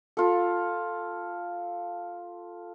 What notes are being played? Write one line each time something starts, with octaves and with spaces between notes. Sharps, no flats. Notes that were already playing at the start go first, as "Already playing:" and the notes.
F4 A4